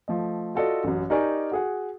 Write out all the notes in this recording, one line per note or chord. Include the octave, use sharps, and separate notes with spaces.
F3 A3 D#5
F4 F#4 A4 D5 D#5
A1 F#2
D#4 G4 A#4 D5 G#5 C#6
F#4 G#4 F#5